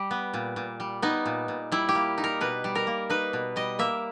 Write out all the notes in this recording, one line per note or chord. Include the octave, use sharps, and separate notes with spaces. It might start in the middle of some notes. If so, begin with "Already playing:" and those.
Already playing: G3 G4
B3
A#2
A#2
G3
B3 D#4
A#2
A#2
G3 E4
G4
A#3
D#4
A#4
B2 B4
G3
A#4
A#3
D#4 B4
B2
G3 D#5
A#3 E5